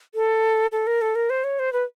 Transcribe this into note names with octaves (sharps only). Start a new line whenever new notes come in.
A4
A4
A#4
A4
A#4
C5
C#5
C5
B4